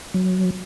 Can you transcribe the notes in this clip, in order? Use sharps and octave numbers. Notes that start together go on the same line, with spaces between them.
F#3